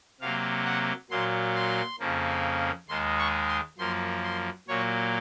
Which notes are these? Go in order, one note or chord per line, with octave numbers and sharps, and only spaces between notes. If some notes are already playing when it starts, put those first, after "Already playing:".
C3 F#3 A#3 F5
F#5
A#2 F#3 A#3 C6
C6
F2 C#3 F3 A#3
D#2 D#3 G#3 C6
C#6
C6
F#2 F3 A#3 C6
C6
A#2 F#3 A#3 C#5